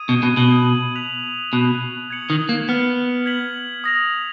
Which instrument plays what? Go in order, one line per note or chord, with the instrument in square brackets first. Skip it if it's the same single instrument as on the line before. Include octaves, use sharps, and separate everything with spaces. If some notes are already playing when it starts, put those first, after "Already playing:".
Already playing: [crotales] D#6 G#6 D#7
[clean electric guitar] B2
B2
[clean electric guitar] B2 [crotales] G#6 C#7 F#7
[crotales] F#6 B6 F7
[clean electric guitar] B2 [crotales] C#6 F#6 B6
[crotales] G#6 C#7 F#7
[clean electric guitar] D#3
A#3
[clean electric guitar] B3 [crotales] F6 G#6 B6
[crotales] G#6 B6 F#7
D#6 A#6 F7